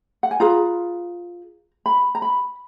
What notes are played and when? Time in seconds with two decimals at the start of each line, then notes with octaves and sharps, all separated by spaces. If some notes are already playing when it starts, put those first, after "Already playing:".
0.23 F#5
0.31 G#5
0.40 F4 G#4 B4 A#5
1.86 B5
2.15 A#5
2.22 B5